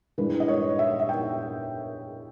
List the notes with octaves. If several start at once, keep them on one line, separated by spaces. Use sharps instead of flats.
G2 E3 G#3 B4
D#5
C#5
E5
E5
G5